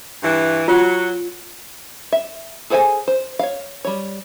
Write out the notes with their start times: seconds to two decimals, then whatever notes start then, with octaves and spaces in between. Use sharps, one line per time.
0.23 G2 E3
0.68 F#3 F4
2.12 E5
2.70 G#4 A4 C5 G5 G#5
3.08 C5
3.39 C#5 F5
3.85 G3 C#5